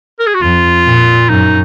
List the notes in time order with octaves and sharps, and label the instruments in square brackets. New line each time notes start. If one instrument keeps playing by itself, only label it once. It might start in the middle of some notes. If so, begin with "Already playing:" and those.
[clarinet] A#4
G#4
F#4
[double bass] F2 [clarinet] F4
[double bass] A#2
[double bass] F#2 [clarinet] D#4